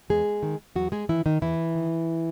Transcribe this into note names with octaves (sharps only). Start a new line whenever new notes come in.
E2 G#3 G#4
D#3
E2 F#3 F#4
G#3 G#4
D#3 E3 E4
D#3 D#4
E2 E3 E4
D#3